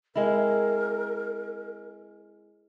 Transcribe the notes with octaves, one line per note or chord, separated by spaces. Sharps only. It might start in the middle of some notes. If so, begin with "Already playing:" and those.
G#3 C4 E4 A#4